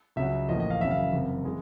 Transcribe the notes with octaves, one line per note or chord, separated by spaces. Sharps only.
C#2 C#3 F#3 E5
A1 A2 F3 A#3 D#5
D#5
F5
F#1 E2 C#3 F#3 E5
F5
F#1 E2 C3
E3 G#3